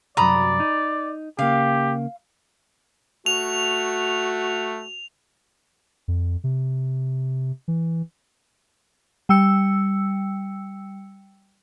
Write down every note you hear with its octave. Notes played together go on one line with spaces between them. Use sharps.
C2 F#2 F#3 D5 A#5 B5 D#6
D#4
C#3 A#3 G4 F5
A3 F#4 F7
F2
C3
E3
G3 G5 E6 C#7